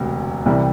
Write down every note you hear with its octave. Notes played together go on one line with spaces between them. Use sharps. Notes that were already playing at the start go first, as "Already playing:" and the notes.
Already playing: E1 D2 C3
C2 C3 E3 G3